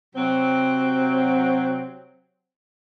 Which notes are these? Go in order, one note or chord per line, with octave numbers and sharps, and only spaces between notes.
C3 F#3 C4